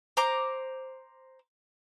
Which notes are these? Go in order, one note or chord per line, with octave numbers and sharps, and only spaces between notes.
C5 A#5 D6